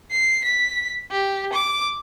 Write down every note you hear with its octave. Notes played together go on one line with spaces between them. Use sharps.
C7
B6
G4
D6